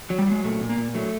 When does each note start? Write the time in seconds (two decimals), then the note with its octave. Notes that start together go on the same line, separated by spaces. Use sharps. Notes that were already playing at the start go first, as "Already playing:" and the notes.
0.10 F#3
0.19 G3
0.27 F#3 G#3
0.44 A#2 A3
0.61 A#2
0.69 A#3
0.78 A#2
0.95 F#3 A3